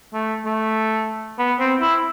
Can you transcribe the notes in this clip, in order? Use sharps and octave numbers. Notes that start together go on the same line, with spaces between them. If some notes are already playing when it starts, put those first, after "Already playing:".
A3
A3
B3
C4
E4